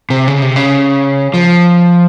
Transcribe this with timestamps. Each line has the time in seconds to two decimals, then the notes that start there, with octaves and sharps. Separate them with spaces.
0.10 C3
0.28 C#3
0.42 C3
0.56 C#3
1.34 F3